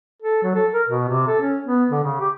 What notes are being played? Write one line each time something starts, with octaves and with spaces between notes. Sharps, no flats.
A4
F#3
A4
A#4
B2
C3
A4
C#4
B3
D3
C#3
G4